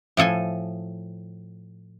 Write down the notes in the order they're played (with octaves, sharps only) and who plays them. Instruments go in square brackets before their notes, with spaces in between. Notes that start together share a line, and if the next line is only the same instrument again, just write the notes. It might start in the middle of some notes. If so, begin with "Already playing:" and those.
[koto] A2 F3 A4 G#5